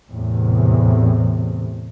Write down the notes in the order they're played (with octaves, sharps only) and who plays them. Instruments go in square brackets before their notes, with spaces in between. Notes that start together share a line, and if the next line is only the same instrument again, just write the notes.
[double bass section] E2 A2 C3